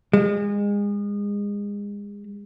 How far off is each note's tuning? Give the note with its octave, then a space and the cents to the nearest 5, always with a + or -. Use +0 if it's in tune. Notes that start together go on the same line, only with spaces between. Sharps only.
G#3 -30